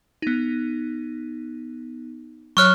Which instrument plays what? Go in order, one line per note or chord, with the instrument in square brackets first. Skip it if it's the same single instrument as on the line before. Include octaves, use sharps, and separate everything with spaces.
[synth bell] B3 D#4
[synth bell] F#3 C#5 [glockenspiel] C#6 F6 F#6